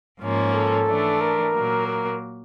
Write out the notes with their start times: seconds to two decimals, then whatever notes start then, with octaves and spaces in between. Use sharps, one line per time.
0.21 G#2 F3 A#3 C#4
0.54 A4
0.87 E3 A3 D4
1.21 A#4
1.54 A#2 F#3 A#3
1.87 A#4